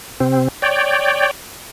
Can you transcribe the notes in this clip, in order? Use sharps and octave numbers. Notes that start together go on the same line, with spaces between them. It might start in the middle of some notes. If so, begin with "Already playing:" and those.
C3 C4
C#5 D5 G5